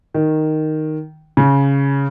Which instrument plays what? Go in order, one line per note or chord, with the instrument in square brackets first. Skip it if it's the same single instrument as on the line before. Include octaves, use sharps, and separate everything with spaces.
[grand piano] D#3
C#3